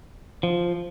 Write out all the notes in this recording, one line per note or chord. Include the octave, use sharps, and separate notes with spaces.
F3